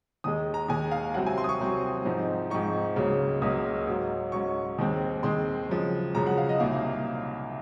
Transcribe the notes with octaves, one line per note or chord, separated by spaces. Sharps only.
D#2 D#3 G#3 D#6
A#5
D#2 D#3 G#3 G#5
F5
C2 C3 F#3 C4 F#5
G#5
C6
D#6
C#6
C2 C3 F#3 C4
G#2 F3 C4 D#4
G#2 F3 C4 D#4 C#6
C#2 C#3 F#3 A#3 C#4
C#2 C#3 F#3 A#3 C#4 D#6
G#2 F#3 C#4
G#2 F#3 C#4 C#6
D#2 D#3 G#3 C4
D#2 D#3 G#3 C4 C6
F#2 C#3 F3 G#3
F#2 C#3 F3 G#3 A#5
F#5
F5
D#5
C2 A#2 F#3 A#3 D#4 F5